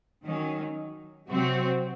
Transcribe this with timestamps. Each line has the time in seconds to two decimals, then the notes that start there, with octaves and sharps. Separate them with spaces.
0.24 D#3 F#3 C#4
1.30 C3 F#3 C4 F#4